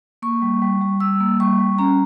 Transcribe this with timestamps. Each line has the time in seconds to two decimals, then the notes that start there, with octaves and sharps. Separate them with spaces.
0.22 A#3 C#6
0.42 G3
0.62 G3
0.81 G3
1.00 G3 E6
1.20 A#3
1.40 G3 C#6
1.60 G3
1.79 C#4 A#5